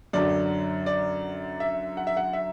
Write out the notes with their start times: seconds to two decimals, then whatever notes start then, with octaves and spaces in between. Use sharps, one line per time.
0.13 F#2 D3 F#3 D5
0.86 D5
1.60 E5
1.97 F#5
2.07 E5
2.17 F#5
2.33 E5